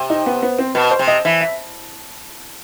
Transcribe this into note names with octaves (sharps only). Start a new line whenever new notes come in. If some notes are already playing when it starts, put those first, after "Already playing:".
Already playing: C3
D#4
B3
B3
C4
B2 B4
C5
C3
D#5
E3 E5
E5